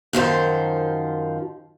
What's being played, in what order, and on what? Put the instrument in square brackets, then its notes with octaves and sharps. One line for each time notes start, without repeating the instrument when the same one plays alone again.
[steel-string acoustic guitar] F#2 D#3 F3 C5